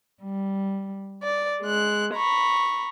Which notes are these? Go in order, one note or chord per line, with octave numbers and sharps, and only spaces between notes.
G3
D5
G#3 F#6
A#5 B5 C#6